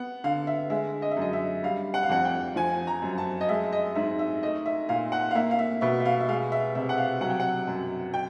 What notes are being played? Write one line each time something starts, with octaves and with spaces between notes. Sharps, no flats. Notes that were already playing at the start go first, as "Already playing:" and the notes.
Already playing: B3 F#5
D3 F5
E5
G#3 E5
D#5
E5
F#2 D#5
E5
G3 F5
F#5
F5
F2 F#5
G5
F3 G#5
A#5
F#2
A5
D#5
G#3 E5
D#5
G#2 E5
E5
A3 D#5
E5
A#2 F5
F#5
F5
A#3 E5
F5
E5
B2 E5
E5
F5
E5
G#3 F5
E5
C3 E5
F#5
F5
F#3 F#5
G5
F#5
F#2
G5